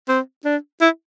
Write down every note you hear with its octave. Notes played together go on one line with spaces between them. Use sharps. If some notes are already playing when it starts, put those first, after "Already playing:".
C4
D4
E4